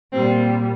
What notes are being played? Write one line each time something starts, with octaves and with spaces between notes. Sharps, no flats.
A#2 G3 C4